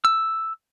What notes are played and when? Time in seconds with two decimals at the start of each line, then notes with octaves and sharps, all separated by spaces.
0.05 E6